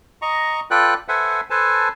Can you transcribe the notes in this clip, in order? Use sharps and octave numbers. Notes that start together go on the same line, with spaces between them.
D#5 A#5 C#6
F4 A4 B4 D5 G5 F#6
A4 B4 C5 E5 F#5 G#5
A4 B4 C5 G#5 A5